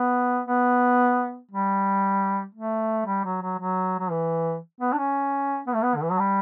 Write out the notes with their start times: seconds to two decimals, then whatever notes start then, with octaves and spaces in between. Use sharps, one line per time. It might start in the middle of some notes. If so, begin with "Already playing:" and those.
Already playing: B3
0.46 B3
1.51 G3
2.55 A3
3.06 G3
3.25 F#3
3.42 F#3
3.59 F#3
3.99 F#3
4.11 E3
4.81 B3
4.93 D4
4.98 C#4
5.67 B3
5.74 A3
5.82 B3
5.95 D3
6.03 E3
6.11 F#3
6.19 G3